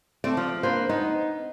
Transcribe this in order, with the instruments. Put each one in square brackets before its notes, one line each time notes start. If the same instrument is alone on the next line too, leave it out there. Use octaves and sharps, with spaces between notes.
[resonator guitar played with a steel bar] A3 C4 [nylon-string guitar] D5
[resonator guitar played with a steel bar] F3
[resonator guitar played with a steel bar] A#3 [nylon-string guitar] D4 B4 C5
[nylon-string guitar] B3 [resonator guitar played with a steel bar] D#4